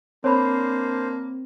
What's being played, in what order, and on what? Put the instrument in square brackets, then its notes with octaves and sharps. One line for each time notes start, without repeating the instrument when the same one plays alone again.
[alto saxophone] A#3 [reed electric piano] C4 [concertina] D4 C5 [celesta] C#5 B5